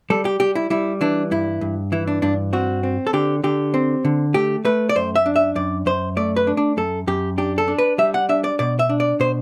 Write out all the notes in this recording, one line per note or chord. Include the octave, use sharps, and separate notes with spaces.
G3 A4
G4
G3 G4
E4
G3 E4
E3 D4
G2 E4
G2
E3 E4
D4
G2 D4
C4 F#4
C4
A4
D3 G4
D3 G4
C4
D3
A3 G4
A3 B4
D5
F#2 C5
E5
D4
E5
F#2 D5
F#2 C5
A3 D5
B4
D4
D4
F#2 A4
F#2 G4
D4 G4
A4
D4
B4
G3 E5
F#5
D4 E5
D5
B2 D5
E5
D4
D5
B2 C5